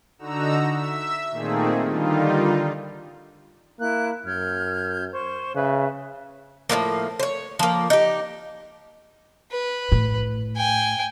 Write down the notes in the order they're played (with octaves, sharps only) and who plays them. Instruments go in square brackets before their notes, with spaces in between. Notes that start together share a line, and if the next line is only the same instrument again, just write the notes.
[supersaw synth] D3 D#4 F#4 A#5 E6
E5 E6
A#2 D#3 A3 A#3 C4 G#4
D3 D#3 G3 D#4 F4
[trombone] A#3 [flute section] E4 F#6
[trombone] F#2 [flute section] F6 G6 G#6
[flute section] C5 C#6
[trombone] C#3 [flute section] B4 E5
[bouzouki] A2 C#3 F3 A#3
C5 C#5
F3 A#3
D#4 G4
[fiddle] B4
[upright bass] A2
[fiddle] G5 G#5